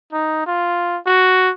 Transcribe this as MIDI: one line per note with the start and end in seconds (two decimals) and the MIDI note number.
0.13 0.45 63
0.46 0.98 65
1.06 1.51 66